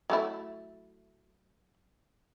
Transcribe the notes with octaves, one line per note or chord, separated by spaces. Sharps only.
F#3 A3 E4